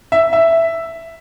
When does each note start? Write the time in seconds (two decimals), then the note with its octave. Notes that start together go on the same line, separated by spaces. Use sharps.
0.12 E5
0.33 E5